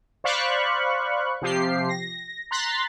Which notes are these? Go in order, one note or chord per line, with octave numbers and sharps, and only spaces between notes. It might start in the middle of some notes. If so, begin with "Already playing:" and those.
C5 D5 F5 B5 C#6 F#6
C3 F3 G4 C7
A#6
A#5 C6 F#6 A6 B6